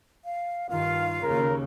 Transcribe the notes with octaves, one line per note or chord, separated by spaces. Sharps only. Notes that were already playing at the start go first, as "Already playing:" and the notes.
F5
G2 D#3 F4 F5
D#2 C#3 A#4